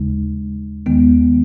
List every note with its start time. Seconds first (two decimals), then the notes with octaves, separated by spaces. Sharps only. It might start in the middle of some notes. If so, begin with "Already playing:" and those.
Already playing: D#2 C#3 G#3 D#4
0.86 D#2 D#3 G#3 B3